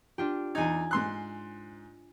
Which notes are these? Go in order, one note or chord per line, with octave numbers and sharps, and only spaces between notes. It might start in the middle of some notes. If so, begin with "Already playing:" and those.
D4 F4 G4
E2 D#4 G#5 G#6
G#2 C6 F#6